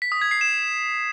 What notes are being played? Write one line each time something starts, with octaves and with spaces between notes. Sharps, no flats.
B6
D#6
G#6
C7
E7